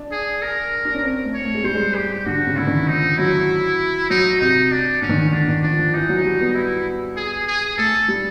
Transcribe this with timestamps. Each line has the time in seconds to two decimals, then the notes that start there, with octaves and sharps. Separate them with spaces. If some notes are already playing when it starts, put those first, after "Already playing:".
Already playing: D4
0.12 G#4
0.42 A#4
0.85 D4
0.94 C#4
1.03 C4
1.24 A3
1.34 C#5
1.44 A3
1.54 G#3
1.64 G3 C5
1.74 G#3
1.96 G4
2.26 D3 F#4
2.47 C#3
2.57 D3 E4
2.67 D#3
2.88 F3 D#4
3.18 F#3 E4
4.10 F#3 D#4
4.41 C3 D#4
4.72 D4
5.02 D3 C#4
5.09 D#3
5.17 D3
5.33 D3 D4
5.48 D#3
5.63 F3 D4
5.79 F3
5.94 E3 D#4
6.09 F#3
6.25 G3
6.40 B3
6.55 E4
7.17 G#4
7.47 G#4
7.78 A3 A4
8.08 G3